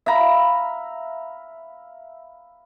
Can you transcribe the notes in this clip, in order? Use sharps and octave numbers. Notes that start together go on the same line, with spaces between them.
E5 F5 A#5 B5